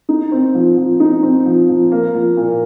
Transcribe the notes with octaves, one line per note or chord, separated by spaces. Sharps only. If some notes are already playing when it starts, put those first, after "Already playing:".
D#4
C4
F3
F3
D#4
C4
F3
F3
A#3
F3
A#2